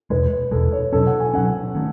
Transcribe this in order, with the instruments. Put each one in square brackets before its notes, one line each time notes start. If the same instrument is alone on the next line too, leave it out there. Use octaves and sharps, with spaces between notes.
[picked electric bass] E2 B2 G#3 [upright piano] B4
[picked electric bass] E2 B2 G#3 [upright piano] A4
[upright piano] C#5
[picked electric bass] B2 F#3 C#4 [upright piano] A4
[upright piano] F#5
G#5
[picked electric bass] B2 F#3 C#4 [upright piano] F#5
[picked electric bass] D#3 A3 C#4